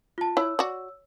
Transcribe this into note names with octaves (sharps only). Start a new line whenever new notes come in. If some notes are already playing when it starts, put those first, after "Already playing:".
F4 A5
E4 C#5 E6
F#4 D5